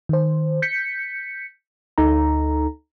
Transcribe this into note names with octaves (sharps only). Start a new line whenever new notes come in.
D#3 C5
G6 B6 C#7
D2 D#4 A4 A#5